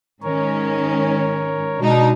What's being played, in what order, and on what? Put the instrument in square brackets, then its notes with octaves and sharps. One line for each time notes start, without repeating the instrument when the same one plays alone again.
[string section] G#2 D#3 C#4 [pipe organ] A#4 C#5
[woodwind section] B2 [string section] G#3 D4 D#4